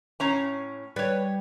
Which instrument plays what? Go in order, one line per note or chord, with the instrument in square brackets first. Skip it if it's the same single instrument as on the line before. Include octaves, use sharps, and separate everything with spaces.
[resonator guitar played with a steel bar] A2 C#4 A#5
[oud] G3 [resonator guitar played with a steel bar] B4 C#5